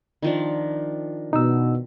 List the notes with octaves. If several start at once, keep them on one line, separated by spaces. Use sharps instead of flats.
D#3 F3 D4
B2 D#4 E6